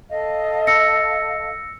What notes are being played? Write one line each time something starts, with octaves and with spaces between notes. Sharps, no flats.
A4 D#5 F5
E6 A#6 C#7